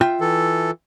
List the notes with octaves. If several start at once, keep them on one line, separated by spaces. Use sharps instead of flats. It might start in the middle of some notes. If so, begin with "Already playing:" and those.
F4 E5 G5
E3 A4